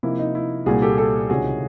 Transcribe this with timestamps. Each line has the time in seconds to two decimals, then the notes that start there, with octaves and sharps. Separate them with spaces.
0.03 C3 F3 A#3 D#4 E4
0.19 D#4
0.35 E4
0.66 C2 A#2 G3 F#4 G#4
0.82 G4 A4
0.98 G4 A4
1.30 C#2 C3 D#3 G#3 C#4 F#4 G#4